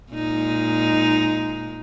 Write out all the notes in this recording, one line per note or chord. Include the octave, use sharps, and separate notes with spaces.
A#2 G#3 D#4